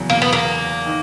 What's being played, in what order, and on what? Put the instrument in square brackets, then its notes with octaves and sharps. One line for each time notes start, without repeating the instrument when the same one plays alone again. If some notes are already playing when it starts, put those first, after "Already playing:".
Already playing: [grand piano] E2 C#3 F#3
[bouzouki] A#3
B3
A#3
[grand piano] D#3